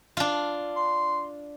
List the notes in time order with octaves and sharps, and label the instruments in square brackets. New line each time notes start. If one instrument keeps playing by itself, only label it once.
[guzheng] D4 F4
[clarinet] C6